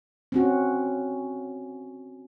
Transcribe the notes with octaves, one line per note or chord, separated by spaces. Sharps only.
C4 C#4 F#4